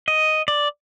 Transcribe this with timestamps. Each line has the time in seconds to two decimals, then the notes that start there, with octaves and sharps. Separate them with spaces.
0.08 D#5
0.48 D5